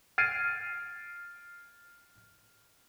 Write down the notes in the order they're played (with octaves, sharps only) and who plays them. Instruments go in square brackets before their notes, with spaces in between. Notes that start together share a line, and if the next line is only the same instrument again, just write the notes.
[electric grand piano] F6 G#6 A6 C7 D7 D#7